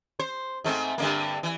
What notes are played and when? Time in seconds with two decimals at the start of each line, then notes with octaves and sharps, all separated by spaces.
0.19 C5
0.64 G#2 A3 C4
0.98 G2 D3 A#3
1.43 E3